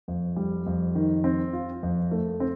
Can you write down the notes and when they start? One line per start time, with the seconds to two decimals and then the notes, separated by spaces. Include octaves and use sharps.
0.08 F2
0.36 G3
0.66 F2
0.95 D#3
1.24 C4
1.53 F4
1.83 F2
2.11 A3
2.40 C4